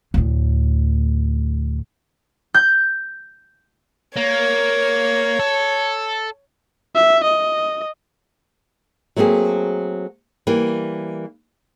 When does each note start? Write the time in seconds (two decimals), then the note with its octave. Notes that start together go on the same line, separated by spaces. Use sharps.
0.14 D2 A2
2.54 G6
4.16 A#3 C#5
5.40 A4
6.95 E5
7.24 D#5
9.16 F#3 A3 A#3 C4 G#4
10.47 E3 G3 A#3